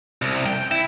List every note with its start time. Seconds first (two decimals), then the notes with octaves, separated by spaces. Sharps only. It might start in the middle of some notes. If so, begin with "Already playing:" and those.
0.22 C2
0.46 G5
0.71 E4